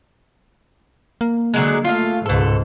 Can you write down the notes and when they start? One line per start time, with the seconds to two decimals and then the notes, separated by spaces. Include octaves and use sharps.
1.21 A#3
1.54 D3 F#3 G#3
1.84 A3 F4 F5
2.26 C#2 G#2 B2 A4